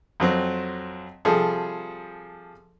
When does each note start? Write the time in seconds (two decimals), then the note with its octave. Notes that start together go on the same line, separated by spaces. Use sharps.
0.20 F2 F#3 C4
1.25 C3 F3 G3 G#4 A4